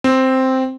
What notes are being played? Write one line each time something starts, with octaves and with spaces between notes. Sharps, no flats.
C4